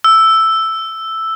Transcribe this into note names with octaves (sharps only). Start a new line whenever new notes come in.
E6